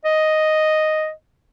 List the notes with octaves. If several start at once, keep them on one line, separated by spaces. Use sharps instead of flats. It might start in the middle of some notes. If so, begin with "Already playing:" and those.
D#5